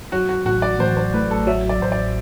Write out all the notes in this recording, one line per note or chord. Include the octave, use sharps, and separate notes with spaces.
F#3 F#4
F#4
A1 F#4
D5
A1 C5
C5
A2 B4
A4
F#3 E5
D5
A1 C5
D5